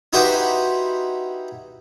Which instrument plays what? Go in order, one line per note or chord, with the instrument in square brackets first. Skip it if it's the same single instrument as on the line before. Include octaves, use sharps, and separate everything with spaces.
[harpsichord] D#4 E4 F#4 G4 B4 C5